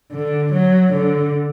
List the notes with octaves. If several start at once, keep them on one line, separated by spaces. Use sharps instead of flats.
D3
F#3
D3